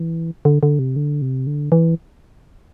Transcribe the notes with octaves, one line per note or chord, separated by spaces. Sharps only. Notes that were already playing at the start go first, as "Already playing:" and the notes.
Already playing: E3
D3
D3
C3
D3
C3
D3
E3